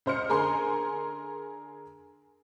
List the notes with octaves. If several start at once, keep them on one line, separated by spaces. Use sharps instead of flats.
C#2 C5 F6 C#7
D3 G#4 A#4 G#5 C6